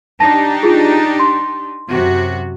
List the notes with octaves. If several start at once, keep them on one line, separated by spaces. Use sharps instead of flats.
D4 D#4 G4 A5 A#6
F4 G#4
C6
F#2 C3 F#4